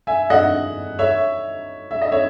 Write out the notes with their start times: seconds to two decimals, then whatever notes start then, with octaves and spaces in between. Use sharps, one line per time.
0.07 E5 G#5
0.30 D#5 F#5
0.99 C#5 E5
1.91 E5
2.02 D#5
2.11 C#5 E5